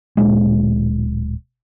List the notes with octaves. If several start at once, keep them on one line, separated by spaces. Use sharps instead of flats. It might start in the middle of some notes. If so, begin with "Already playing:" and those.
D1 A#2 G#3